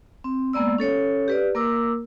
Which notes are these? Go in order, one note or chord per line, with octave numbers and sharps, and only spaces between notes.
C4
G#3 A#3 B3 D5 E6
C#4 A4 C#5
G4 B4 D5
A#3 A#4 D6 E6